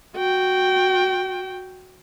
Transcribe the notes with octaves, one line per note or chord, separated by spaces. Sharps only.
F#4 G5